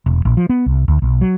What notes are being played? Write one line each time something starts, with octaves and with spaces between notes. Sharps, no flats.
E1
A#1
F3
B3
C2
D2
B1
F#3